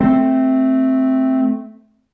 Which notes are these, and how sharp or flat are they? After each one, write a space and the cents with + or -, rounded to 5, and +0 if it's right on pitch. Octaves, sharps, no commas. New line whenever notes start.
A3 +0 C4 +0